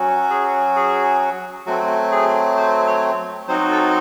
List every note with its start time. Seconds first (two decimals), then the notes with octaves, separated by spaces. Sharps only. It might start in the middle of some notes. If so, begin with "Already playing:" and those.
Already playing: F#3 C#4 F#4
0.30 G#4
0.76 G#4
1.66 F#3 A3 C4 F#4
2.12 G#4
2.57 C5
2.87 C#5
3.48 F#3 C4 D#4 F#4 C5
3.71 A4